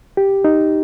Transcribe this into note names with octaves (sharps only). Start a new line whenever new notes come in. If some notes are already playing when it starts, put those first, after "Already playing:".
G4
D#4